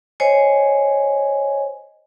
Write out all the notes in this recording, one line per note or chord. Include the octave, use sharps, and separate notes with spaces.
C5 C#5 D#5 G#5